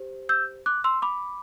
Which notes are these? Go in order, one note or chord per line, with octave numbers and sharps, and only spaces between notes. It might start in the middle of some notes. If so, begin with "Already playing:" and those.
Already playing: G4 C5
E6 G6
D6 F#6
C6 E6
B5 D6